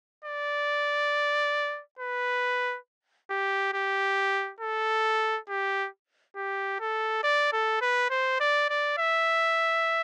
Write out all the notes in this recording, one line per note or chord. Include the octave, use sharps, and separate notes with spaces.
D5
B4
G4
G4
A4
G4
G4
A4
D5
A4
B4
C5
D5
D5
E5